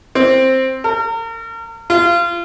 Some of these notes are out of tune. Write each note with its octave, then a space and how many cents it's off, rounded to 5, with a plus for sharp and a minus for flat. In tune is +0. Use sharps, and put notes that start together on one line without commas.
C4 +5
A#4 -35
F4 -25